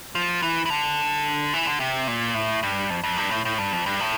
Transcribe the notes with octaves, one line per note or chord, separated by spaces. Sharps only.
F3
E3
E3
D3
E3
D3
C3
A#2
A2
G2
F2
F2
G2
A2
A2
G2
F2
G2
A2